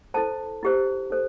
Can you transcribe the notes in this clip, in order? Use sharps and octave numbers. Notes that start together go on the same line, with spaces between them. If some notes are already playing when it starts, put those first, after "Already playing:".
E4 A4 C5 A5
E4 G4 C5
D#4 A4 C5